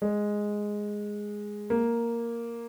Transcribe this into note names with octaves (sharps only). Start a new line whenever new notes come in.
G#3
A#3